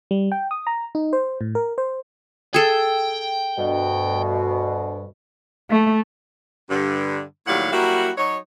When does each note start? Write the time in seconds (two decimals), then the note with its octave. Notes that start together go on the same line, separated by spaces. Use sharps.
0.11 G3
0.32 G5
0.51 D#6
0.67 A#5
0.95 D#4
1.13 C5
1.41 A2
1.55 A#4
1.78 C5
2.54 G#4 A4 G5
3.57 D2 G2 B2
5.70 A3
6.70 G2 D3
7.47 D#2 A2 F#3 G3 F5 F#5
7.72 F#3 G3 A#3 E4 F#4
8.17 F#3 D#4 C#5